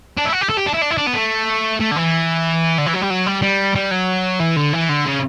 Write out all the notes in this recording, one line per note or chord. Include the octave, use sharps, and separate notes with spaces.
D4
E4
F#4
G4
A4
G4
D4
E4
D4
E4
D4
B3
A3
A3
D3
E3
D3
E3
F#3
G3
F#3
G3
G3
G3
F#3
E3
D3
E3
D3
C#3